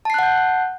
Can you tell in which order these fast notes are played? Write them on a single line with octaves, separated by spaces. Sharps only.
A5 C7 F#6 F#5 G6